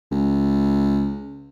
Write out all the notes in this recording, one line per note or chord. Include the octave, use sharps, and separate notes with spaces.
C#2